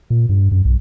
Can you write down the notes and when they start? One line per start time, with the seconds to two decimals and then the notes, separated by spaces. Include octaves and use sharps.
0.10 A#2
0.29 G2
0.52 F#2
0.65 B1